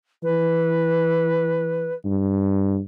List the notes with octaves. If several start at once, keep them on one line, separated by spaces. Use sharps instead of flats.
E3 B4
G2